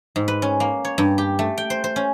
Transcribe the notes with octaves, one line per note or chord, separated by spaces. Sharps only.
G#2
B4
C#4
A#3
C#5
G2
G4
A3
G5
C5
C5
C#4